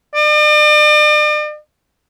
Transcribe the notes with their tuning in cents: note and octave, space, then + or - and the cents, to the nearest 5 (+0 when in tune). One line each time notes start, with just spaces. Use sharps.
D5 +40